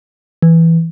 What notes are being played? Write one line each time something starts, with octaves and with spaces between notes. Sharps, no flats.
E3